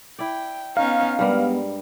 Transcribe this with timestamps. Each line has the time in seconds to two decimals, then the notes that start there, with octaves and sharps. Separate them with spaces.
0.19 E4 D5 G5
0.77 B3 C#4 D#4 F5
1.19 G2 G3 G#3 B3 A#4